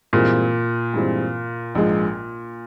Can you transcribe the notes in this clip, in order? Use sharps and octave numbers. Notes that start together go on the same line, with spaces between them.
G2 A#2 E3 G#3 C4
G2 E3 G#3 C4
A#1 G#2 F3 G#3